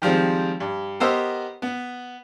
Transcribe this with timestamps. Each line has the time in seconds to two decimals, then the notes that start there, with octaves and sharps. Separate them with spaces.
0.02 D#3 F3 G3 G#3 C4
0.60 G2
1.00 B3 G4 A#4 C5 D#5 E6
1.62 B3